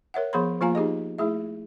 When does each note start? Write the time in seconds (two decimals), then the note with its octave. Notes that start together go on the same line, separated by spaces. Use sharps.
0.14 A#4 C#5 E5 F#5
0.33 F3 B3 G#4 C#5 B5 C6
0.61 F3 A#3 F4 F5 G#5 A#5
0.75 D#4 G4 G#4 D#5
1.18 A3 E4 G#4 E5